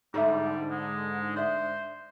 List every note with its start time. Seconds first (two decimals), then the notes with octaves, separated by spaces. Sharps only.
0.14 G#2 D3 G3 D#4 E5
0.71 G#3
1.36 C5 D5 E5